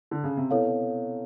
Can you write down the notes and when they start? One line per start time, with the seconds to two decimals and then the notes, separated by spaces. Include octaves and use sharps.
0.11 D3
0.24 C#3
0.37 C3
0.51 B2 E4 A4 C#5 F5